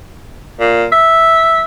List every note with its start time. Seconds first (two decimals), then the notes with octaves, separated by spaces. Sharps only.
0.60 A#2
0.92 E5